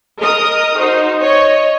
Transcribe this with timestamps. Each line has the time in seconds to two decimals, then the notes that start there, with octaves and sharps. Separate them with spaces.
0.19 A#4 D#5 D#6
0.77 D#4 F#4 C5
1.20 C#5 D#5